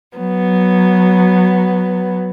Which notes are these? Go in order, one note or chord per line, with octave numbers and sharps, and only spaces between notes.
F#3 B3